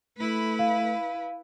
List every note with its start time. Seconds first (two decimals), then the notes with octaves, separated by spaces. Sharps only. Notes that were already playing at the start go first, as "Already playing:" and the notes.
0.18 A3 E4 B4
0.59 F5